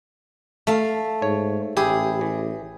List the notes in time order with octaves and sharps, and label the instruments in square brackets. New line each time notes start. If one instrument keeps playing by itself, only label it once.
[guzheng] A3 F5
[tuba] G#2 [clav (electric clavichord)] C#5
[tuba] A1 [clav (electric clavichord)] E4 G4 [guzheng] G#4
[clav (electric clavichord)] E3